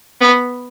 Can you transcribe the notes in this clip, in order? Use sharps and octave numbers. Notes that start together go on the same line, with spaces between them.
B3